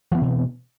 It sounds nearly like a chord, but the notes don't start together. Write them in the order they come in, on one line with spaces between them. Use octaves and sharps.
E3 B3 C4 B2